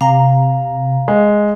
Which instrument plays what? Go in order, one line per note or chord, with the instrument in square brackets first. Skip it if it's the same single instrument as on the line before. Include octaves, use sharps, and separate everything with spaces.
[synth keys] C3 A#5 [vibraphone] F5
[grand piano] G#3